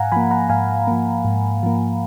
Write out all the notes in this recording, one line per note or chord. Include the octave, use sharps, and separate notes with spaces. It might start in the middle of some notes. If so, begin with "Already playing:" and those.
Already playing: G#2 F5 F#5 G#5 A#5
F3 A#3 G#5 B5
F#5 A#5
G#2 F5 G#5
F3 A#3
G#2
F3 A#3